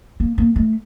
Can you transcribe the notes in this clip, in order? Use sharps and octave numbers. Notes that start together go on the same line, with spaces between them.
A#3
A#3
A3